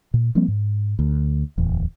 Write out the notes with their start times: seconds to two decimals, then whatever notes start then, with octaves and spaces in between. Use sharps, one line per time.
0.14 A#2
0.35 F3 G3 A#3 C4
0.48 G#2
0.99 D2
1.58 D1 E2